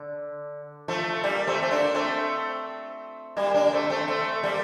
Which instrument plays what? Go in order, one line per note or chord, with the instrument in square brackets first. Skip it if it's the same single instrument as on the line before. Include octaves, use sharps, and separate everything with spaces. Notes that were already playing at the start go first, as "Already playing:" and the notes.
Already playing: [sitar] D3
F3 A3
G3 A#3
A3 C4
C4
A#3 D4
A3 C4
G3 A#3
A#3 D4
A3 C4
A3 C4
A3 C4
G3 A#3